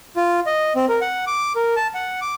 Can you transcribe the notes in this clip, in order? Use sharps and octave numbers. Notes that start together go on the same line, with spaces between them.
F4
D#5
C4
A#4
F#5
D6
A#4
A5
F#5
D6